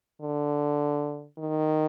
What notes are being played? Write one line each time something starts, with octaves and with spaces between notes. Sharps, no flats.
D3
D#3